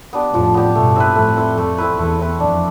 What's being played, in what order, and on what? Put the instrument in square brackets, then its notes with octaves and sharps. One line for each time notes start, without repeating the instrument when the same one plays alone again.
[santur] B3 D4 G4
[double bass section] F2 A2 [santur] F3
[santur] B3 D4 G4
[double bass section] G2 B2 [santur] A3
[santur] C4 E4 B4
[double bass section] F2 A2 [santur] A3
[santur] C4 E4 B4
[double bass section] F2 [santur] A3
[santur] C4 E4 B4
[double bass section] E2 [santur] A3
[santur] C4 E4 B4
[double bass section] F2 [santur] D4